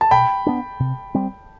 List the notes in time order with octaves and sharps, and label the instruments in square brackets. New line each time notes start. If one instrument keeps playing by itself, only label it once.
[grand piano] A5
[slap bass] B2 [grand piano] G5 B5
[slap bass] B3 D4
C3
G3 C4